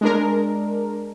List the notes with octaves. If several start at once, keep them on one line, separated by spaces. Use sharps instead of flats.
G#3 D4 A#4